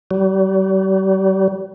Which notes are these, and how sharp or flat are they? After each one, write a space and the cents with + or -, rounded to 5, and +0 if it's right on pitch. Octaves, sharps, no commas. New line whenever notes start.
G3 -40